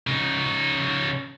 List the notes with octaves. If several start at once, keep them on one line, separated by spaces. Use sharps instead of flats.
C#3 D#4